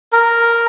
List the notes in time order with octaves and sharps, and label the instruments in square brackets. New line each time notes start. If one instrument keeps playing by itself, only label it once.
[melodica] A#4